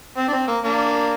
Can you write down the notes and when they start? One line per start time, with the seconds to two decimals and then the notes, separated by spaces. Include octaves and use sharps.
0.17 C4
0.28 D4
0.33 C4
0.48 A#3
0.63 A#3 D4